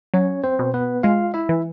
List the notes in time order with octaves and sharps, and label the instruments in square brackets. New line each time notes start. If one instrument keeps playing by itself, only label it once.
[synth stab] F#3 [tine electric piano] C#4 C#5
[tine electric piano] C4 C5
[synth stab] B2
[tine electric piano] B3 B4
[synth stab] G#3 [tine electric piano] F4 F5
[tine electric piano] E4 E5
[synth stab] E3